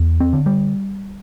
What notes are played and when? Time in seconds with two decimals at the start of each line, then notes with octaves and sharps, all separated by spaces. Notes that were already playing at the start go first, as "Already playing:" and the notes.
Already playing: E2
0.20 C4
0.33 D3
0.46 G3